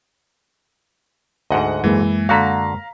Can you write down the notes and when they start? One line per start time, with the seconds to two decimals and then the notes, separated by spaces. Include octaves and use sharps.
1.51 D2 G#2 D#5 F#5
1.84 F#2 E3 G#3 A#3
2.29 D3 F#4 F5 A#5 B6